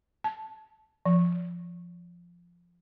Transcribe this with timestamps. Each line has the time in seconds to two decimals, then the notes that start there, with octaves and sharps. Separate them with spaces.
0.24 A5
1.06 F3